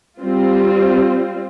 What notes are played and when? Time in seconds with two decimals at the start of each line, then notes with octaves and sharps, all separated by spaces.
0.18 G3 C4 F4